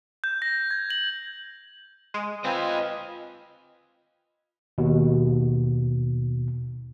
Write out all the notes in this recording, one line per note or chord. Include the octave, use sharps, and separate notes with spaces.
G6
A#6
G#6
F#7
G#3
C4 F4 B4 D#5 F5 G#5
D#2 B2